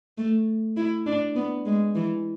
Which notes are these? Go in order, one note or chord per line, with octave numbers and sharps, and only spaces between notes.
A3
E4
D4
B3
G#3
E3